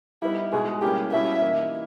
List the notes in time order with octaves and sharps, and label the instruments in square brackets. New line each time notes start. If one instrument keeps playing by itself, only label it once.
[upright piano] G3 B3 D#4 [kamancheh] E4
[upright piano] B2 G#3 D#4 [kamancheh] G#4
[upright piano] G3 A#3 C#4 E4 [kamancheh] G4
[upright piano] B2 G3 C#4 E4 [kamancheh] E5
[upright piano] E3 A#3 D#4